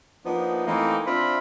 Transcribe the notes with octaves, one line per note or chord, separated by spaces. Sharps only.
F3 A#3 B3 D4 D#4
E3 A3 A#3 C4 D#4
C4 D4 F4 E5 B5